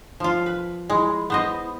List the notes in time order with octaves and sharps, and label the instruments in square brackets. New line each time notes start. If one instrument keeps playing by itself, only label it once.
[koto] F3 F4
B4
[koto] G#3 [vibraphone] E4 B5
[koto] B3 C5 D#5